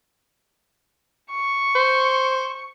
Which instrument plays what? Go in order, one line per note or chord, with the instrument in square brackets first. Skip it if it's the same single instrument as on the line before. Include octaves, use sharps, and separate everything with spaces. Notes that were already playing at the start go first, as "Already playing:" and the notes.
[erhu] C#6
[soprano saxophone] C5